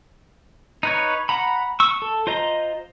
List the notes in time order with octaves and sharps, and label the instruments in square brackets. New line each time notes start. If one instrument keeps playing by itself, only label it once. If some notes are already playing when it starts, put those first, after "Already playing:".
[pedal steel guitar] D#4 B4 C#5
F#5 A#5 B5
C#6 E6
A4
F4 C5 D#5 A#5